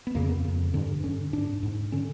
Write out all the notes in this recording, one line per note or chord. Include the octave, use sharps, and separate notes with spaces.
B3
F2 C#3 A#3
B3
F2 C#3
G2 D3
G2 D3 C#4
G#2 D4
G#2
D3 C#4